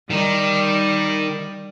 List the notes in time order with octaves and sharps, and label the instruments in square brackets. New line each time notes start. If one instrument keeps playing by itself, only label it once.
[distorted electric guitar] D#3 D#4 [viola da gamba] G3